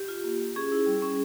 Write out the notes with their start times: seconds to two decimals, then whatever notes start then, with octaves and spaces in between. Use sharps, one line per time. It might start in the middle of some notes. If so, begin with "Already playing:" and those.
Already playing: G4
0.08 F4
0.24 A#3
0.40 F4
0.56 C#4 G#4
0.72 E4
0.86 G3
1.02 C#4